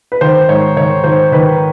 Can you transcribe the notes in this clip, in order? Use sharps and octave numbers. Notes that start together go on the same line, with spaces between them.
B4
D#3 C5
G#2 C#5
D#3 C#5
D#3 C5
D#3 B4